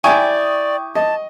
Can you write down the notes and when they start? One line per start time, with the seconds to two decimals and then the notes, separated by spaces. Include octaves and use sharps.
0.04 E4 G4 D5 G5 G#5 C#6 D#6
0.95 D#5 A5